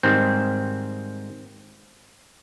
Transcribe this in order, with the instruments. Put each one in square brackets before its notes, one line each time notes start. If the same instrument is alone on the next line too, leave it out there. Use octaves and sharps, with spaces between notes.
[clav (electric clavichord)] G#2 D#3 G3 C4